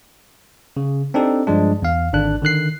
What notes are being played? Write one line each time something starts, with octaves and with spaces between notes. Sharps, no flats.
C#3
C4 D4 D#4 G4 A4
G2 F3 G#3 D4
E2 F5
G#1 D3 D4 F#6
D3 D#3 F#6 C7